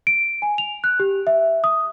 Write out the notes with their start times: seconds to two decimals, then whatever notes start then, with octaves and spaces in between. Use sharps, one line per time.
0.07 D7
0.42 G#5
0.58 F7
0.84 F#6
1.00 G4
1.27 E5
1.64 D#6